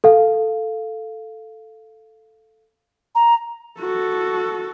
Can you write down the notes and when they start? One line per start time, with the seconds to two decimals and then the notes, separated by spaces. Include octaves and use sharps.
0.04 A4 F5
3.15 A#5
3.80 F#4 A4